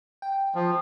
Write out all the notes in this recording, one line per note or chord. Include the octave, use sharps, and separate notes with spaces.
G5
F3